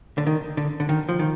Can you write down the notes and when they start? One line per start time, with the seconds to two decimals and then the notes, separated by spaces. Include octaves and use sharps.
0.18 D3
0.27 D#3
0.57 D3
0.80 D3
0.89 D#3
1.09 F3
1.19 D#3